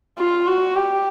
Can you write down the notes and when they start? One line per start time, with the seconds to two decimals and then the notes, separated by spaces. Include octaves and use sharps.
0.18 F4
0.47 F#4
0.76 G4